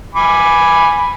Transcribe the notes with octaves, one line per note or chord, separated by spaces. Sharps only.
G#5 B5 D6